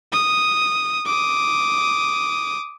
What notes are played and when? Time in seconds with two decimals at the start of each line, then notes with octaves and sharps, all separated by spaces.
0.13 D#6
1.06 D6 D#6